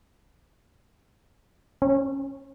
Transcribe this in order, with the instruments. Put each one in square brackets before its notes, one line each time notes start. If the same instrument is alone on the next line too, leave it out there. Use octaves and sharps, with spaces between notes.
[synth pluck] C#4